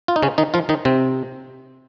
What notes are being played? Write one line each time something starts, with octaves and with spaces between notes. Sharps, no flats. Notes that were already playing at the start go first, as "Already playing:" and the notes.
F4
D#4
C#3 C#4
D#3 D#4
F3 F4
D#3 D#4
C3 C4